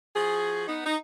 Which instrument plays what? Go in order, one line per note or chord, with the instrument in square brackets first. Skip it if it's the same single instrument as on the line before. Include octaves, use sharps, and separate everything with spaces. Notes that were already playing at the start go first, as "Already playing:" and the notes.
[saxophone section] F3 F#4 G#4
B3 D#4
D#4